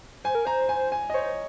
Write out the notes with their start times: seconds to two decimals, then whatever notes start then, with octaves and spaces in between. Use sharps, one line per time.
0.24 C5 G#5
0.35 A#4
0.45 C5 A#5
0.69 G#5
0.92 G#5
1.10 D#5
1.14 C5 C#5